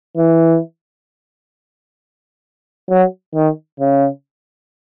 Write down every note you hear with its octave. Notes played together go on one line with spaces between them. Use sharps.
E3
F#3
D#3
C#3